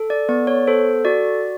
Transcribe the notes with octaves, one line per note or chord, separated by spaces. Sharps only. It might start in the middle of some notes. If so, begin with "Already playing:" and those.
Already playing: A4
D5
B3 D5
C#5
A4 C5
F#4 D5